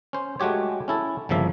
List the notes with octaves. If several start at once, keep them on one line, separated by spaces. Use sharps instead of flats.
C#4 C5
G#3 A3 F#4 G4 C#5
C#4 E4 A4
G1 C#3 F3 A#3 E5